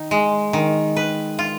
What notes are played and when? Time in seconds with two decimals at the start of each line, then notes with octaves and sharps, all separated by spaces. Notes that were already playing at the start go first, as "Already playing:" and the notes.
Already playing: D#3 D#4
0.11 G#3
0.53 D#3
0.96 B4
1.39 F4